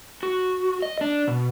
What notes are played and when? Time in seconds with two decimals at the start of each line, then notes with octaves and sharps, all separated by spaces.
0.23 F#4
0.82 D#5
1.01 D4
1.28 B2